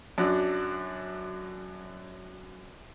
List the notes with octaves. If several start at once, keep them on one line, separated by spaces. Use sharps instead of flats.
F#2 F#3 D4